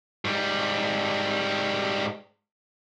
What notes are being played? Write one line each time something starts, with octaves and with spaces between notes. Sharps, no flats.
G#2 G3